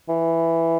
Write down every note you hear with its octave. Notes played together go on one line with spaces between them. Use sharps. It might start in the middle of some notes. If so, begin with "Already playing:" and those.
E3